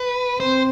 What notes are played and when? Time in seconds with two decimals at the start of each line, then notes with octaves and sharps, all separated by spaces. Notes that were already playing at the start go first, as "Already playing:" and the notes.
Already playing: B4
0.40 C4 C5